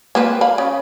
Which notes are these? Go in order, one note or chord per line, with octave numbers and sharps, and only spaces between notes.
A#3 C4 B4
F5 B5
C#3